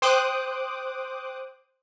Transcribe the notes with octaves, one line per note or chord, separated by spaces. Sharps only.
C5 G5 D6 D#6 F#6